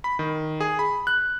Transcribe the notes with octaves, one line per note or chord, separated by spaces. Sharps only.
B5
D#3
G#4
B5
F#6